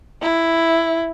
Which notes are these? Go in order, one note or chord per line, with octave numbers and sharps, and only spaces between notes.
E4